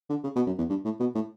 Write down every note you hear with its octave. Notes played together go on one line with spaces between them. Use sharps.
D3
C#3
B2
F#2
E2
G2
A2
B2
A2